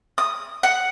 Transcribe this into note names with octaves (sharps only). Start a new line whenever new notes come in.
D#6
F#5